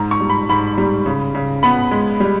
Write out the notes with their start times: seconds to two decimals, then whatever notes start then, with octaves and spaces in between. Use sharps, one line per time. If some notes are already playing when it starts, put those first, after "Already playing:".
Already playing: G#2 A#5
0.11 C#6
0.20 G3
0.30 B5
0.49 G#2 B5
0.78 G3
1.06 C#3
1.35 C#3
1.63 B3 B5
1.91 G#3
2.20 G3